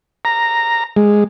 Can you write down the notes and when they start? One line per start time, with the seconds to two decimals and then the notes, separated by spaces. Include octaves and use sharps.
0.25 A#5
0.96 G#3